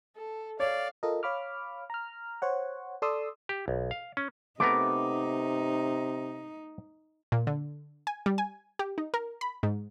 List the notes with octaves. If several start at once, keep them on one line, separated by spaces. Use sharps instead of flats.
A4
C#5 D5 F5
F4 A4 A#4 D#5
C#5 F5 B5 D6 F6
A#5 F6
C5 C#5 F#5
A4 D5 C6 D#6 E6
G4
B1
F5
C#4
C3 A3 B3 D#4 A#4 D6
A#2
D3
G#5
G3
G#5
G4
D#4
A#4
B5
G#2